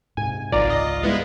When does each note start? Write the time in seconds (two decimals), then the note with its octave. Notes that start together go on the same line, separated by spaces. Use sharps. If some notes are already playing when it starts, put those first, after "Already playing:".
0.17 G#2 C3 G#5
0.52 G#1 C#2 G#2 F4 D5 A#5
0.70 D#5
1.03 G3 G#3 B3 E4